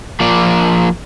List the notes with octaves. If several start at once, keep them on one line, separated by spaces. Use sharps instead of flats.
F3 A#3 D5